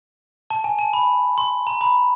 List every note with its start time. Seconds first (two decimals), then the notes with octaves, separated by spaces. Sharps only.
0.50 A5
0.64 G#5
0.79 A5
0.93 B5
1.38 C6
1.67 A#5
1.81 B5